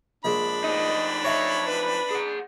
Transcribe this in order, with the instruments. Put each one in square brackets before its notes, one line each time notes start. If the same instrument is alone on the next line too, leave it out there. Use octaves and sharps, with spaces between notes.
[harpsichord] A#1 G#3 [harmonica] D4 B5
[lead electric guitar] F2 D#4 [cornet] D#5
[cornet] C#5 [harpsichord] D#5 E5 A#5
[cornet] B4
[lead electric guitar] G#4 F#5